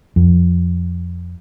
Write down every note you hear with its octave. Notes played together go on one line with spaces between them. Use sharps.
F2